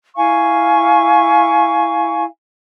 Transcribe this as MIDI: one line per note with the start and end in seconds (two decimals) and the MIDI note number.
0.16 2.23 64
0.16 2.23 77
0.16 2.23 80
0.16 2.23 85